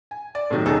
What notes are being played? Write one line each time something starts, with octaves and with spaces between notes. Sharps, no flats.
G#5
D5
A2 C3 D#3 F#3
D#1 B2 D#3 D#4 G#4 A4